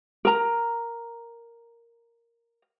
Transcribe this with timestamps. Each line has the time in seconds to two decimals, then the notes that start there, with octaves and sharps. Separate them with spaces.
0.25 A#4 A#5